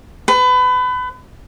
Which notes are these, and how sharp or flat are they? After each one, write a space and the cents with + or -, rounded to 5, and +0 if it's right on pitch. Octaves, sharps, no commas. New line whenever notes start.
B4 +30